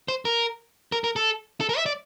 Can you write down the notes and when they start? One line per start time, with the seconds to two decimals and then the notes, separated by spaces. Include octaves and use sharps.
0.08 C5
0.25 A#4
0.92 A#4
1.04 A#4
1.16 A4
1.61 A4
1.69 A#4
1.77 E5
1.86 D5